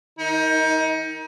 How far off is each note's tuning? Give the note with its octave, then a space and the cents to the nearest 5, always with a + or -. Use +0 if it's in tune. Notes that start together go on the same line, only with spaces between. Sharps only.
D#3 +0 D#4 +30